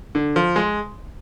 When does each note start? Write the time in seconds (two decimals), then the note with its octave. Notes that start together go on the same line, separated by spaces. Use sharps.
0.15 D3
0.36 F3
0.56 G#3